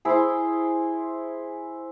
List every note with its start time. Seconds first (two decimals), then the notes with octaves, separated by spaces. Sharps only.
0.05 E4 G#4 C5 E5